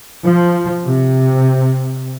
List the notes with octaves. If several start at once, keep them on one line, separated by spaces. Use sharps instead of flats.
F3
C3